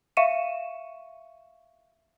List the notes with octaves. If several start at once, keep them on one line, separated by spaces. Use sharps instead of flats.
E5 F5 C#6 C#7 D#7 E7